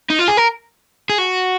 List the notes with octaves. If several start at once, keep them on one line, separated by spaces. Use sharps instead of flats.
D#4
F4
G#4
A#4
G#4
F#4